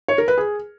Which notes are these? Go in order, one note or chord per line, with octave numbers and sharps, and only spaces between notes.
C#5
A#4
B4
G#4